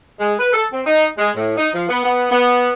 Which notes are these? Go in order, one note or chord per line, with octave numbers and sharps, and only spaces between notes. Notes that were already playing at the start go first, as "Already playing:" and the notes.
G#3
B4
A4
C4
D#4
G#3
A2
D#4
F3
B3
B3
B3